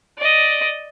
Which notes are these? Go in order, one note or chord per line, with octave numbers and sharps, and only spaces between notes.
D5 D#5